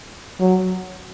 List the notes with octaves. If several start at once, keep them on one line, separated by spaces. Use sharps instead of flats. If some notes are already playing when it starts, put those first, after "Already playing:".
F#3